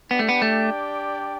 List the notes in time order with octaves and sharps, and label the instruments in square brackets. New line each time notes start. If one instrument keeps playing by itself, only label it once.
[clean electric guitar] B3 [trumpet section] D4 G4 D5 G5
[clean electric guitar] A3
B3
A3